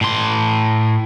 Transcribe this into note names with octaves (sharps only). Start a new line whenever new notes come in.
A2 C6